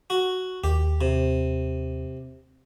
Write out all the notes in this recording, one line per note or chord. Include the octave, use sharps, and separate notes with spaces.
F#4
D#2 G4
C3